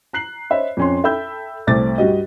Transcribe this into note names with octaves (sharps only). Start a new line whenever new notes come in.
A#5 F#6 C7 F#7
C5 C#5 D#5 E5 B5
F2 C#4 C6
A4 E5 G5 B5 E6 G6
C2 A3 C4 D6 A6
G2 F#4 G4 D#5